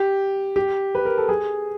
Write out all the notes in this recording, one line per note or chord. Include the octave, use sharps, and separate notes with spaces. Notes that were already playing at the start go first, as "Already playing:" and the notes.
Already playing: G4
G4
B4
A#4
A4
G#4